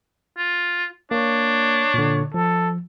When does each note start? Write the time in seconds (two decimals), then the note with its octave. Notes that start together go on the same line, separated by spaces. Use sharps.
0.37 F4
1.11 A#3 D4 C#5
1.94 A#2 D3
2.34 F3 A4